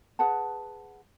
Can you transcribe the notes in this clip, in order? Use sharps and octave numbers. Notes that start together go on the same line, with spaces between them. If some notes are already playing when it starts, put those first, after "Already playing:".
G#4 B4 F#5 A5